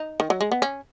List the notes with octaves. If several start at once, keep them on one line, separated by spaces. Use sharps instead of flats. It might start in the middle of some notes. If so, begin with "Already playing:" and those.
Already playing: D#4
D#3
F#3
G#3
B3
C#4